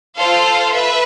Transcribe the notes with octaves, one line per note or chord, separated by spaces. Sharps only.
F4 A4 C5 F5
B4 E5